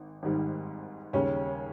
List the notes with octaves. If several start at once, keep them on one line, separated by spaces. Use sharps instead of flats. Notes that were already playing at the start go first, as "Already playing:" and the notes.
Already playing: G#1
G#1 G#2 D#3 G3
D#2 C#3 G3 C#4